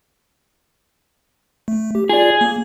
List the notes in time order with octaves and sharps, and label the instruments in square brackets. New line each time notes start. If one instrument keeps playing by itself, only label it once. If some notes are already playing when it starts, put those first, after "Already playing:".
[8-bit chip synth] A3
G4
[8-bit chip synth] F4 D5 [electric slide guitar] G#4
[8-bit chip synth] A#3